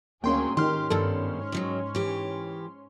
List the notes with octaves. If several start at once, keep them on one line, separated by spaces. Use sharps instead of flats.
D2 F#3 A#3 C#4 G#4 G5 C6
G#2 D#3 C#4 G4 C6 F6
G2 B2 D#3 A4
D#3 F3 F#3
E3 G4